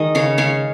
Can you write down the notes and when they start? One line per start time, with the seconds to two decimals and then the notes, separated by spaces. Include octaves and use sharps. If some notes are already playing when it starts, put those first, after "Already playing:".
Already playing: D#3 G#3 D#5
0.15 C#3 C#5 F5
0.38 G#3 C#5 F5